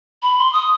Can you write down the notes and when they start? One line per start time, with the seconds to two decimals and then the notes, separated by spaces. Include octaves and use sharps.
0.23 B5
0.38 C6
0.53 D#6